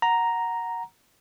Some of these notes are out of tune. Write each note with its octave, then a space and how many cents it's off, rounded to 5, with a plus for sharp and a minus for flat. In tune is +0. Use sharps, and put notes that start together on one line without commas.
F#5 +0 A#5 +0